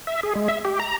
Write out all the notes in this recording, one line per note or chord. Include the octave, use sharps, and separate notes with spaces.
E5
G#4
G#3
E5
G4
A#5